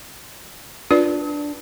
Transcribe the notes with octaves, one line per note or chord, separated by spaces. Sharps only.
D4 F4 B4 D5